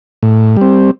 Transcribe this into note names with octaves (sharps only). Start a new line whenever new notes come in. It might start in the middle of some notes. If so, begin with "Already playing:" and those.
A2
G3 C4